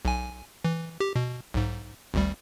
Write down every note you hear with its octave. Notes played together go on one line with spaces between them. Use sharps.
B1 G#5
E3
G4
B2
B1 G#2
G#1 D2 G3